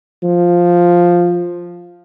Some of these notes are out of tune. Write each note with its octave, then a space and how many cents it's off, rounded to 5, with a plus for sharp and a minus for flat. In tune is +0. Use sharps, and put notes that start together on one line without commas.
F3 +5